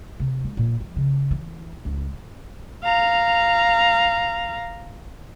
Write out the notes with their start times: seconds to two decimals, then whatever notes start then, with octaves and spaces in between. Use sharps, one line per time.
0.20 C3
0.44 G#3
0.57 A#2
0.80 F3
0.96 C#3
1.31 E3
1.85 C#2
2.84 F5 A#5